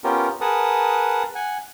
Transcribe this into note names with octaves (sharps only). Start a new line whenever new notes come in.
B3 C#4 F4 G4 A#4
G#4 A#4 B4 F#5 A5 D#6
F#5 G#5